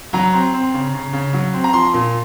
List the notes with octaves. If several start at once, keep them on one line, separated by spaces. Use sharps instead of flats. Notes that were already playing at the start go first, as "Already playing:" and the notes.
F#3 A#5
C4
C4
C#3
C#3
C#3
F#3
C4
A#5
F3 C6
A#2